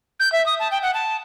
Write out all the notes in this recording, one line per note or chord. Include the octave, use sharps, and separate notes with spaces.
G6
E5
D#6
A5
G5
F#5
A5